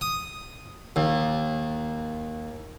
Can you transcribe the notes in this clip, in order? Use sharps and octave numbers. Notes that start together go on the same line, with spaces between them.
D#6
D#2